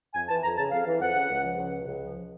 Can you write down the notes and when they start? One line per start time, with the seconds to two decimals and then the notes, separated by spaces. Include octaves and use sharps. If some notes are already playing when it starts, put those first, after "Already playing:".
0.14 F2 G#5
0.28 E3 A5
0.43 F2 A#5
0.58 C#3 A5
0.72 F2 F5
0.86 E3
1.01 F2 F#5
1.16 C#3
1.30 C#2
1.44 F3
1.58 C#2
1.73 C3
1.88 C#2
2.02 F3